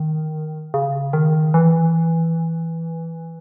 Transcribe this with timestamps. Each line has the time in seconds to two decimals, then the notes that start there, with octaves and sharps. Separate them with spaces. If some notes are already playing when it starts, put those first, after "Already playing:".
Already playing: D#3
0.74 C#3
1.13 D#3
1.54 E3